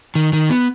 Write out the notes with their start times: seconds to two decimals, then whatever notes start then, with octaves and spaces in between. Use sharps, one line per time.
0.15 D#3
0.33 D#3
0.50 B3